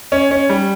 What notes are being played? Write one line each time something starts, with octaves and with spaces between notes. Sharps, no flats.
C#4
C#4
G3